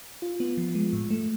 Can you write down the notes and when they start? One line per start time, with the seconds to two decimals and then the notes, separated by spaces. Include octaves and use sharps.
0.22 F4
0.40 B3
0.58 F3
0.75 G#3
0.93 A2
1.10 A3